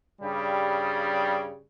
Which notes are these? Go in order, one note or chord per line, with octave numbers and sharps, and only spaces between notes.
G2 C#3 G3